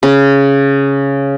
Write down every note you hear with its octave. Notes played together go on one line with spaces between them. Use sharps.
C#3